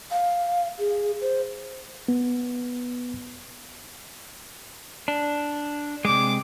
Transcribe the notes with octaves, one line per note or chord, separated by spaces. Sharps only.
F5
G#4
C5
B3
D4
C3 G#3 D6